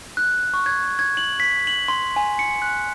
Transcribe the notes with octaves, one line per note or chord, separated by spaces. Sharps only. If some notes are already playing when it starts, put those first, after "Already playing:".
F#6
C#6
G#6
G#6
F#7
B6
F#7
C6
G#5
C#7
F#6